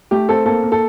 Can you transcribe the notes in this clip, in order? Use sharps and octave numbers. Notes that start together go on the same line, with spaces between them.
A3 G4
C4 A4
A#3 A4
A#3
A4